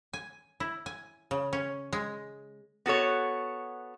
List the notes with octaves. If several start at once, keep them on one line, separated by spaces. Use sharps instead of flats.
G#5
E4
G#5
C#3
C#4
G#3
B3 F#4 A4 C#5